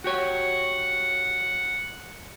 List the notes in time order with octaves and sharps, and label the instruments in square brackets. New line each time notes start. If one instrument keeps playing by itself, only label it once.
[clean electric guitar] F#4 G4 C#5 [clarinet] F#5